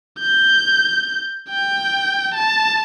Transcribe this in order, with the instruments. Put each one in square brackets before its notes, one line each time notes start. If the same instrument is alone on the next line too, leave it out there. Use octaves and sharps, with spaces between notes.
[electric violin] G6
G5
A5